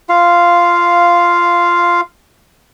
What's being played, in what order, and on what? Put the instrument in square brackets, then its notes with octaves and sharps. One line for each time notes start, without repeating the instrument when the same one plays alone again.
[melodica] F4 F5